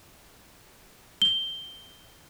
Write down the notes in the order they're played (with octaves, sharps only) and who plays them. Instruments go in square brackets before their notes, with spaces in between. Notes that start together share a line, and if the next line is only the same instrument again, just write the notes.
[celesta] G7